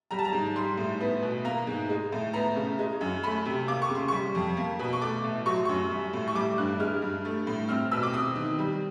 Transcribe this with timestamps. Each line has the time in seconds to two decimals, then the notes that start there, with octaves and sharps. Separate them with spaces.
0.11 G3 A#5
0.19 A5
0.25 A#5
0.33 G#2
0.56 G3 C6
0.77 A2
1.00 B3
1.22 B2
1.45 A#3 A#5
1.67 G#2
1.89 G#3
2.12 A2
2.33 B3 A#5
2.56 C#3
2.79 G#3
3.01 F#2
3.23 A3 B5
3.45 C3
3.68 A#3 D6
3.82 C#6
3.90 C#3
3.95 C6
4.08 G3 C#6
4.35 F2
4.57 A#3
4.79 B2
4.93 C#6
5.01 A3 D6
5.24 A2
5.46 F#3 C#6
5.56 C6
5.65 F#2 C#6
5.91 G3
6.13 A2
6.28 C#6
6.35 G3 D6
6.58 G2 F#6
6.80 G#3 F6
7.02 G2
7.25 A3
7.47 A2
7.69 C4 F6
7.91 B2 E6
8.03 D6
8.13 C4 D#6
8.36 D#3
8.59 G3